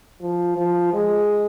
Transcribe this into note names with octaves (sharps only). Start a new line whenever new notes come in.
F3
F3
G#3